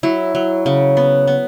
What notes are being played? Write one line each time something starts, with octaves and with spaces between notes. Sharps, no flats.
F#3 E4
F#3
C#3
B3
B3